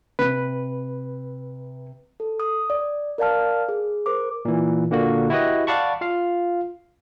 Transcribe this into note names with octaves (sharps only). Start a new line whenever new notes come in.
C3 B4
A4
D#6
D5
A#4 D5 F5 A5 F6
G#4
A#4 C5 D6
A#2 E3
A#2 D3 A#3 F#4
E4 F#4 G4 B4 D#5
D5 F5 F#5 A5 B5 C#6
F4 F5